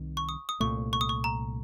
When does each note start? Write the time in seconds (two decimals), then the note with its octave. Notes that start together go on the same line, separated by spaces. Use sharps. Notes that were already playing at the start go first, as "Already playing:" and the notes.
Already playing: C2 C3 D#3
0.17 C#6
0.29 D#6
0.49 D#6
0.60 C2 A#2 A3 C#6
0.93 C#6
1.01 D#6
1.09 C#6
1.24 A#5